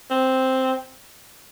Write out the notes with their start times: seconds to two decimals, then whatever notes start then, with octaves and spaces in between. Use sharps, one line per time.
0.11 C4